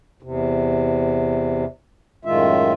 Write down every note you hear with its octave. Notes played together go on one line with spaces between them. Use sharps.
E2 C3
F#2 A2 D#3 G#3 F4 E5